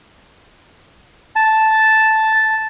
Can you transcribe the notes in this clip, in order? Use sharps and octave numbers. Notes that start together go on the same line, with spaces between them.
A5